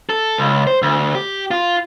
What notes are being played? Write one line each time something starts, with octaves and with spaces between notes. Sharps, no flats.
A4
C#2
C5
D2
G4
F4